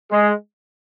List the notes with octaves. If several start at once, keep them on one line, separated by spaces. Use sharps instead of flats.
G#3